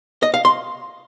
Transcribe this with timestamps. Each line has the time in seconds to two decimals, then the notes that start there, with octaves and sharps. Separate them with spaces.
0.23 D#5
0.34 F5
0.45 C6